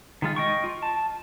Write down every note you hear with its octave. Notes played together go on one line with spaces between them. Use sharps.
D#3 G#3 F4
D#5 G5 C#6
F4
A5